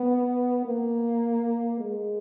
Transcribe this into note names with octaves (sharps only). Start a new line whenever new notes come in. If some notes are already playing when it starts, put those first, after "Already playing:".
Already playing: B3
A#3
G#3